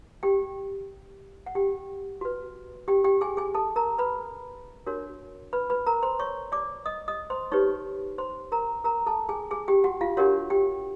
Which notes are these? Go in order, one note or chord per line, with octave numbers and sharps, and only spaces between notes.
G4 G5
F#5
G4 G5
F#4 B4
G4 G5
G4 G5
G#4 G#5
G#4 G#5
A4 A5
A#4 A#5
B4 B5
D4 F#4 A#4 C#5
B4 B5
B4 B5
A#4 A#5
C5 C6
C#5 C#6
D5 D6
D#5 D#6
D#5 D#6
C5 C6
D#4 G4 B4 C#5 C#6
C5 C6
A#4 A#5
A#4 A#5
A4 A5
G#4 G#5
G#4 G#5
G4 G5
F#4 F#5
F4 F5
D4 F#4 G4 A#4 C#5 F#5
G4 G5